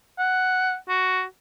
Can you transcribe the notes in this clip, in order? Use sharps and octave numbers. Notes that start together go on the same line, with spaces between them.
F#5
F#4